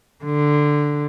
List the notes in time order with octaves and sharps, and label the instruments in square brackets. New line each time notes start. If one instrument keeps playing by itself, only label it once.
[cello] D3